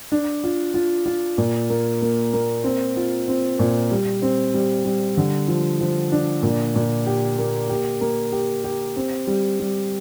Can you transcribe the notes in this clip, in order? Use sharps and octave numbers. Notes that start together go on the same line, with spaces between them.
D4
F4
F4
F4
A#2
A#3
A#3
A#3
C4
F4
C4
A#2
G3
C4
G3
G3
D3
F3
F3
D4
A#2
A#2
G4
A#3
G4
A#3
G4
G4
C4
G3
G3